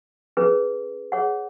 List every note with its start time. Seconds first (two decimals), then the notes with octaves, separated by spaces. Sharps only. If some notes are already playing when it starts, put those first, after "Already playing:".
0.37 C#4 G#4 B4
1.12 G#4 C#5 F#5